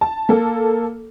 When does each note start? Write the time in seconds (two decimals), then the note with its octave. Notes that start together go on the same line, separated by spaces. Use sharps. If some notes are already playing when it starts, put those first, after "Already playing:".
0.01 A5
0.29 A#3 A4